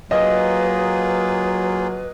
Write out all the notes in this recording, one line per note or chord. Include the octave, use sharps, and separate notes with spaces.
F#3 A#3 F4 G#4 B4 D#5 D#6